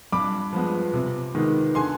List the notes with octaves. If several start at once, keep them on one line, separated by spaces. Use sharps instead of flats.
G2 B5 D6
F3 G#3 B3
C3
D#3 G#3 B3
D3 G#5 C6